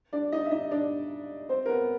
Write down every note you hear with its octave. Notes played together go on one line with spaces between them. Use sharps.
D4 D5
D#4 D#5
E5
D#4 D#5
D4 D5
C4 C5
A#4
B3 B4